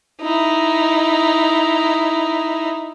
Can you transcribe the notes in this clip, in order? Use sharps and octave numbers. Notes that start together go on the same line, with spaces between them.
D#4 E4